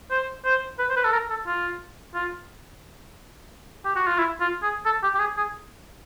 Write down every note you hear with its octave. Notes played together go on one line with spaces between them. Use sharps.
C5
C5
B4
C5
B4
A4
A#4
A4
F4
F4
G4
F#4
F4
E4
F4
G#4
A4
G4
G4
G#4
G#4